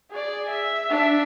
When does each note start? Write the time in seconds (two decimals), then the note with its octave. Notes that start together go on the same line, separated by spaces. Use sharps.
0.11 G#4 D5
0.50 E5
0.90 D4 E5